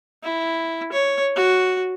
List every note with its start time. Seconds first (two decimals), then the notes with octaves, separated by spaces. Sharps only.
0.23 E4
0.92 C#5
1.36 F#4